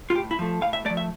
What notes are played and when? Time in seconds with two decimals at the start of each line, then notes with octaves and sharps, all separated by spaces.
0.10 F4
0.15 A2 G4
0.31 E4
0.39 F3 A3
0.61 A2 F5
0.73 E5
0.85 A3 D5
0.90 F3
0.97 E5